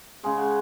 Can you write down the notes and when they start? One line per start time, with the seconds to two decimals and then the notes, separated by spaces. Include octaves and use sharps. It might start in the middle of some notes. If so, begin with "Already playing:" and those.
0.23 C#3 G#3 G#5
0.38 F#5